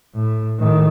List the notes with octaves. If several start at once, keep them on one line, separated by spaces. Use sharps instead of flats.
A2
A2 D#3